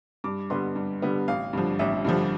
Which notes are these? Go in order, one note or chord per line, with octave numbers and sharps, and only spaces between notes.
G2 D6
D3 G3 B3 C6
G2
D3 G3 B3
A1 F5
G2 D3 F3
A1 E5
G2 D3 F3